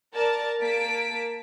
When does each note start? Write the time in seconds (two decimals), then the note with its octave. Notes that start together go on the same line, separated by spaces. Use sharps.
0.14 A#4 D5 A5
0.62 A#3 A5 B6 D7